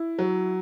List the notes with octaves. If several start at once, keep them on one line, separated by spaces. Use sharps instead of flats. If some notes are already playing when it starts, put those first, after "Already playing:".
Already playing: E4
F#3